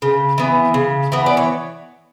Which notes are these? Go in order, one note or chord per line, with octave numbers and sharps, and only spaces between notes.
C#3
E3 B3
C#3
E3 B3
D5
C#5